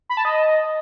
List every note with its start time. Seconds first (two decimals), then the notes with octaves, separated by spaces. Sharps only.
0.09 B5
0.17 A5
0.25 D#5